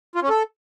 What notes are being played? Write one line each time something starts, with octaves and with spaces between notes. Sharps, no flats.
F4
C#4
A4